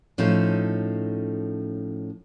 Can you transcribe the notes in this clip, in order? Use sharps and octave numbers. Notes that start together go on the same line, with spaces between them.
A2 F3 C#4 D#4 A4